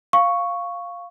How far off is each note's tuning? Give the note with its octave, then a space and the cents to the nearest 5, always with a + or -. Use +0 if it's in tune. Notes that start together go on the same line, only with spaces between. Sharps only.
F5 +0 C#6 +0